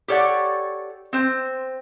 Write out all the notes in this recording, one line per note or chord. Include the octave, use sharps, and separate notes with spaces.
G4 A4 C#5 D5 F#5
C4 C5